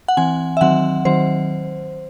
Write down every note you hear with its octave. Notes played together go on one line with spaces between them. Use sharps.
F#5
E3 C4 G#5
E5
D#3 F#3 C4 F#5
D#3 F#3 C4 C5